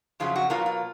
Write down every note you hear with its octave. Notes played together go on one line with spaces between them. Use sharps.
F2 C#3 F#3 A3 F4
F#4
B2 F#3 A#3 F4
F4